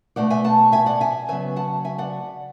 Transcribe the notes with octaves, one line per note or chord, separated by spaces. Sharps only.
B2 A3 D4 D5 F#5
E5 G#5
F#5 A5
E5 G#5
D5 F#5
E5 G#5
C#3 F#3 B3 E5 G#5
F#5 A5
E5 G#5
D5 F#5